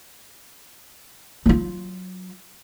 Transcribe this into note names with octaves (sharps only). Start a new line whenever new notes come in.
F#3 F4